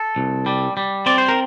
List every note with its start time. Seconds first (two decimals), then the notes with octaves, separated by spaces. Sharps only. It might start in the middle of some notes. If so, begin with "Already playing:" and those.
Already playing: A4
0.16 C2
0.46 G3
0.77 G3
1.06 C4 D5
1.18 C5
1.28 A#4